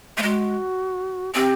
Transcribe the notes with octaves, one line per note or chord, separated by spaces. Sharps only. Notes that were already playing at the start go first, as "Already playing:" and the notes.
A3
G#3 F#4
C4 G4